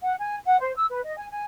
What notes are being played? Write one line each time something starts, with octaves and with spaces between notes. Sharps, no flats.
F#5
G#5
F#5
C5
E6
B4
D#5
G#5
G#5